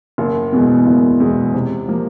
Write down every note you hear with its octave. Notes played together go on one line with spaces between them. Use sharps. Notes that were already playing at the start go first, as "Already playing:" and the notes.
F#1
E2 B2 G#3
F#1
E2 B2 G#3
C3
F3 A#3